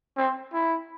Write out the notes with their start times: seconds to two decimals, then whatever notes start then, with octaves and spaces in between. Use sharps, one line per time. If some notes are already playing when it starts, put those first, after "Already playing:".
0.17 C4
0.53 E4